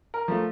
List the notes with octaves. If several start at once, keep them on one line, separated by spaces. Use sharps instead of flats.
A#4
F3 A3